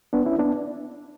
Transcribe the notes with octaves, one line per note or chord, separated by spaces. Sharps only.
B3 D4
C#4 E4
B3 D4